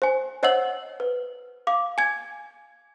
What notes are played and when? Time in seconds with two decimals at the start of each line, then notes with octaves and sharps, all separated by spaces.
0.02 C5 G#5
0.43 C5 C#5 D#5 F#5 E6 F#7
1.00 B4
1.67 F5 D6
1.98 G#5 G#6